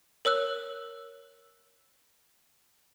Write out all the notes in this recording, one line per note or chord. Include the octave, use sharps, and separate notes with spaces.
A#4 C#5 E6 F#6